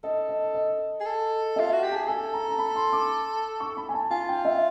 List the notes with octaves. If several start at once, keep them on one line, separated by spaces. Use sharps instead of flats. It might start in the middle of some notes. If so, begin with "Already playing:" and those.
A4 D#5
D#5
D#5
G#4
A4
F4 E5
F#4
G4
G#4 A5
A4 G#5
A#5
A#5
B5
C6
D6
C#6
B5
G#5
A5
F4 G#5
G5
E5